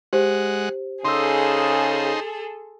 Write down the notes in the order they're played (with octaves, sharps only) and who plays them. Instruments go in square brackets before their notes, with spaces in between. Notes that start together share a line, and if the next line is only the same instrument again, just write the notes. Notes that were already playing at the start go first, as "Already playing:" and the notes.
[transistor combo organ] G#3 F#5 [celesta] G4 C5
[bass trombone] C#3 [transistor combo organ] D#4 C5 [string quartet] G#4 A4 [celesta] C6 E6